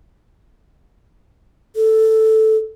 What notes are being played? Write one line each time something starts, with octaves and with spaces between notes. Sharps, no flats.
A4